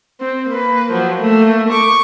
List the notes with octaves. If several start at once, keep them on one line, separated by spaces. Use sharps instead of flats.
C4
A#3 B4
F3 F#3
A3 A#3
C#6 D6